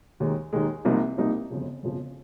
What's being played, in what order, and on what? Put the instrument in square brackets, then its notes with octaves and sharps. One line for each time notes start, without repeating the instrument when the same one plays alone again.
[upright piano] D#2 D#3 G#3
D#2 D#3 G#3
C2 C3 F3 A#3 D#4
C2 C3 F3 A#3 D#4
G1 F2 C#3 F3
G1 F2 C#3 F3